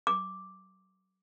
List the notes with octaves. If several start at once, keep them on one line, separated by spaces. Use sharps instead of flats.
D6